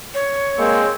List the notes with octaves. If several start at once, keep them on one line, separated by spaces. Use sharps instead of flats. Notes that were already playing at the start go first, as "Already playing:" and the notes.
C#5
G#3 A#3 C4